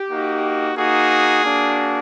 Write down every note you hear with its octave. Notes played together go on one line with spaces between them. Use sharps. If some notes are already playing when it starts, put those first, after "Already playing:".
Already playing: G4
A#3 D#4 F#4
A#3 D#4 F#4 G#4
A#3 D4 F#4